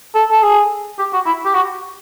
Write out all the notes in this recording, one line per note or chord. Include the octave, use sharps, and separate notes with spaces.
A4
A4
G#4
G4
F#4
E4
G4
F#4